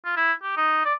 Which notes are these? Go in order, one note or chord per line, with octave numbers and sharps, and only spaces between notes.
F4
E4
G4
D#4
D5